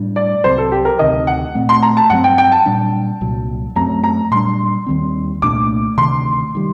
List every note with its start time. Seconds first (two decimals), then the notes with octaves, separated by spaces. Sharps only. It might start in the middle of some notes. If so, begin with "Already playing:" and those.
Already playing: A2 G3 D4
0.16 D5
0.44 C2 C3 F#3 C5
0.58 A4
0.72 G4
0.85 A#4
0.99 D2 C3 D#3 D#5
1.27 F#5
1.55 A#2 A3 C4
1.69 C6
1.83 A#5
1.97 A5
2.10 G2 F#3 A3 C4 F#5
2.24 G5
2.38 G5
2.52 A5
2.66 A#2 G3 D4
3.21 C2 A#2 F#3
3.76 F#2 F#3 A3 C4 A#5
4.04 A#5
4.31 A#2 G3 D4 C6
4.87 D#2 D#3 G3 C4
5.42 C2 A#2 A3 D4 D6
5.98 D2 C3 D#3 C6
6.55 D#3 G3